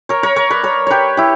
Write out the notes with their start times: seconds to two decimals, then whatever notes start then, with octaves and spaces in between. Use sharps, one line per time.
0.09 A#4 C#5
0.23 A#4 C#5
0.36 A#4 C#5
0.50 B4 D5
0.64 A#4 C#5
0.87 G4 B4 C#5
1.17 E4 G4